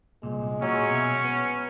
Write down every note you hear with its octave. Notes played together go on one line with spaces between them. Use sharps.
C2 A#2 G#3
A#2 F#3 C#4
B2 E5
B3